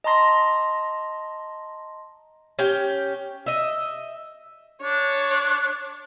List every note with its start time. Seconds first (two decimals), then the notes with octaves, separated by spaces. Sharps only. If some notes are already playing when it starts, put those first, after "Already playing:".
0.04 D#5 A5 A#5 C6 A#6
2.59 C#4 G4 G5
3.46 D#5 E5
4.82 D4 C#5